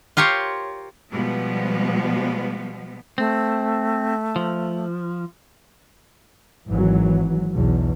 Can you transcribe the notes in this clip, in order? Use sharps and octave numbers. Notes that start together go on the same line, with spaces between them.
F4 G4 A#4 C5 C#5
B2 F3 G3 G#3 B3
A3 C4
F3
G#1 E3 F#3
B1 E2 B2